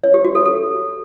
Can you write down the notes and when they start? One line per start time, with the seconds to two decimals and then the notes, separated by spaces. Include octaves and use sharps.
0.04 C#5
0.14 G4
0.25 F#4
0.35 A4
0.46 A4